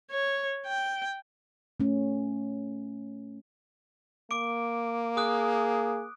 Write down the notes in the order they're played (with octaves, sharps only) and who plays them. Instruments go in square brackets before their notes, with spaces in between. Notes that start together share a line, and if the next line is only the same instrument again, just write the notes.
[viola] C#5
G5
[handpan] A3 C#4
[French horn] A#3 [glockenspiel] D6 D7
[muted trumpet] G#4 [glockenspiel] D#6 F#6